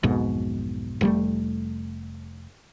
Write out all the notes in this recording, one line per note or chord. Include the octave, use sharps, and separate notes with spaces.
B1 F2 G#2 B2
F1 G3 A3